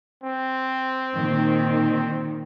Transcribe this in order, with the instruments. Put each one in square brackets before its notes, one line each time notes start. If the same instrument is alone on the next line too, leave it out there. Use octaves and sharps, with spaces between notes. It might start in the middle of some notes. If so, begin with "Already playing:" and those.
[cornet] C4
[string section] A#2 D#3